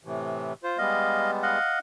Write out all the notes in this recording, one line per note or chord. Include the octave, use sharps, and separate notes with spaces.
A2 C3 E3
F4 C5
G3 G#3 B3 D#5 F5
D#5 F5 F#5